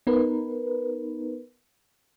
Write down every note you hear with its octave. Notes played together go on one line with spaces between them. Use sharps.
B3 D#4 A#4 B4